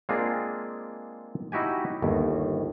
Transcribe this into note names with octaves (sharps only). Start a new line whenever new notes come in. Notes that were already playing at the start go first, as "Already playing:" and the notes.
G#3 A#3 C4 D4 F4 G#4
D#4 E4 F#4 G4 G#5
G1 D#2